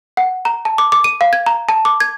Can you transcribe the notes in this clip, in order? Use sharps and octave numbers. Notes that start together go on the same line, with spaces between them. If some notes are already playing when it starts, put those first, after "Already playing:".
F#5
A#5
A5
D6
D6
D#7
F5
G#6
A#5
A5
D6
G#6